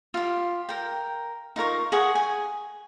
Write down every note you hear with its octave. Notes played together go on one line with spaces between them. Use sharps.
F4 G4
A#4 G5
D#4 F4 A#4 C#6
G#4 F#5 C#6 D#6
G#5